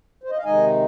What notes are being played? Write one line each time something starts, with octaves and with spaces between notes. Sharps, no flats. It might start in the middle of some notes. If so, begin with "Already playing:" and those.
C5
D#5
F5
C3 D#3 G#3 D#4 D#5 G#5